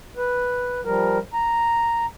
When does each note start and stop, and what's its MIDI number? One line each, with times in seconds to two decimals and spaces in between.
0.17 0.81 71
0.85 1.18 53
0.85 1.18 55
0.85 1.18 70
1.33 2.06 82